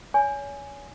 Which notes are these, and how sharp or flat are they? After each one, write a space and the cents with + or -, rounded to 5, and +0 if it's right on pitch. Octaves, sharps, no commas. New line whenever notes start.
C#5 +35 G#5 +0